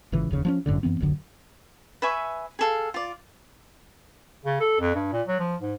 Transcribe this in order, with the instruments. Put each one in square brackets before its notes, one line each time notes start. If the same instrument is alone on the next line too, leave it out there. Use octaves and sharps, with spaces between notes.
[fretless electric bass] G#1 A#2 C#3 E3
F1 D#2 C#3
F3 B3 C#4
G1 F#2 A2 D3
F#2 E3 B3 C4
D1 A#1 F#2 D3
[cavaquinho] B4 E5 G#5 C#6
G#4 A4 F5
F4 D5
[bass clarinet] C#3
A4
F2
G2
A#2
F#3
F3
G#2